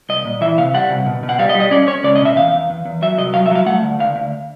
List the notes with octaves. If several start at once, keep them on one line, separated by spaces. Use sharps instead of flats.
C2 D#5
A#2
E3 E5
C3 F5
G3 F#5
C3
B2
B2
F#5
G3 F5
D#5
G3
D#5
C#4 D5
C#4 C#5
C#2 D5
D#5
B2 E5
E2 F5
E2
E2
E2
F#3 E5
C2 D#5
F#3 F5
E5
F#3 F5
A3 F#5
D2
D2 F5
D2